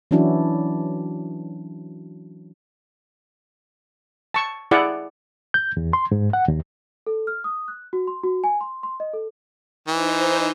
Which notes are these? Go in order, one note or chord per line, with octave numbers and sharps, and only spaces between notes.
E3 F#3 C#4 D4 E4 F#4
A5 C#6
E4 G#4 D5 F#5
G6
E2
C6
G#2
F#5
D#2
A4
F6
D#6
F#6
F#4
C6
F#4
G#5
C6
C6
D#5
A4
E3 D#4 C5